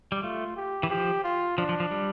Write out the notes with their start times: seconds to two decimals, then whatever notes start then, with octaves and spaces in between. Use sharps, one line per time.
0.12 G3
0.22 A3 F4
0.56 G4
0.83 E3
0.90 F3 G4
1.24 F4
1.58 F3 D4
1.69 F3
1.80 F3
1.91 G3